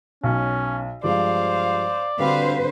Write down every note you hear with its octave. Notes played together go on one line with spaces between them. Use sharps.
B1 C#4
G2 F3 G#3 C5 D5 F5
D3 G3 C4 F#4 B4 C5 F5